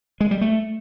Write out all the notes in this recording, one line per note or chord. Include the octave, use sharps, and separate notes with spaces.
G#3
G3
A3